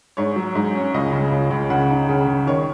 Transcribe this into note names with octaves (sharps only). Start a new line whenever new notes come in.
G#2 C#5
F#3
G#2
C#4
C#2 D#5
C#3
C#2
C#2
C#3 F#5
D#4
C#3
C#3
D#3 C#5